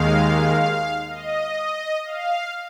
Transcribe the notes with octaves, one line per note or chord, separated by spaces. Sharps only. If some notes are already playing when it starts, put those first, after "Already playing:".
Already playing: D#2 D#3 G#3 F5
D#5
F5